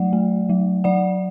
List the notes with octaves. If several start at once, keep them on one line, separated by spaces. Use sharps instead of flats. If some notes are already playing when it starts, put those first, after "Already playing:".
Already playing: F#3 A3 D5 F#5
A3
F#3
F#3 D5 F#5